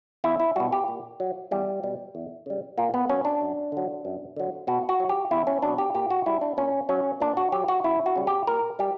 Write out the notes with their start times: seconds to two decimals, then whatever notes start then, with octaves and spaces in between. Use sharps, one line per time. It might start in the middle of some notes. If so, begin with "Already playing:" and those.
0.24 E2 E4
0.40 E4
0.56 B2 G3 F#4
0.72 G4
0.88 A#2
1.20 F#3
1.51 E2 G3
1.83 B2 G3
2.15 E2
2.46 C#3 G3
2.78 A#2 A#3
2.94 B3
3.09 F#3 C#4
3.25 D4
3.41 F#2
3.72 D3 F#3
4.05 F#2
4.36 D3 F#3
4.67 B2 F#4
4.89 F#4
5.00 F#3
5.09 G4
5.31 E2 E4
5.47 C#4
5.62 B2 F#3 D4
5.78 G4
5.94 A#2 G4
6.10 F#4
6.26 G3 E4
6.41 D4
6.57 A#2 C#4
6.89 F#3 C#4
7.20 A#2 D4
7.37 F#4
7.52 F#3 G4
7.68 F#4
7.84 F#2 E4
8.06 F#4
8.16 C#3 G3
8.27 G4
8.47 A#2 A#4
8.79 G3 G4